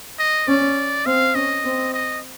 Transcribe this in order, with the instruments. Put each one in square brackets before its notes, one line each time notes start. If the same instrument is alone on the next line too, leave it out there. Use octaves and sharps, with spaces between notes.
[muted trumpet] D#5
[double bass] C#4 [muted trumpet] D5
[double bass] C4 [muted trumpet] F5
[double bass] C#4 [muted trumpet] D#5
[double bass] C4
[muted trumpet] D#5